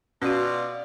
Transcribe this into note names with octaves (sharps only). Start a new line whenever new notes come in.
B2 C#4 F4 F#4 D5